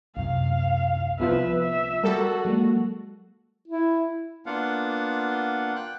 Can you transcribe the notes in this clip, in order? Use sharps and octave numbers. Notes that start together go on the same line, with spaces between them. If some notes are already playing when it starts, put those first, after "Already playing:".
C2 F#2 C3 F5
C2 F3 B3 F4 B4 E5
E5
G3 F#4 A4 A#4
F#3 G#3 A#3
E4
A#3 B3 D4 F4 F5 F#5
G5 F#6